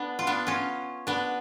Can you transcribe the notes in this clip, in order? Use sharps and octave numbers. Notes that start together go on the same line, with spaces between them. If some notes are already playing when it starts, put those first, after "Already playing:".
Already playing: B3 D4
F4
B3 D4
C#4 F4
B3 D4